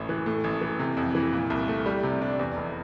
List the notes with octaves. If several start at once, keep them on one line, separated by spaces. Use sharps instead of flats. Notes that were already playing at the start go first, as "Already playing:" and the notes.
Already playing: A1 A2
E3
A2
A1
E3
C3
F2
E3
A#2
C2
A3
G3
C3
D4
E2
F1